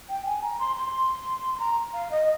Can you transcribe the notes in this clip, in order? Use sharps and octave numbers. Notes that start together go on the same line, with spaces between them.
G5
G#5
A#5
C6
C6
C6
A#5
F5
D#5